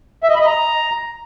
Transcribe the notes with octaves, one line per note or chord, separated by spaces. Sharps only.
E5
D#5
B5
D#5
A#5